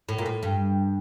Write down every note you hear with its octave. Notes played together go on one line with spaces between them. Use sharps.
A2
A#2
A2
G2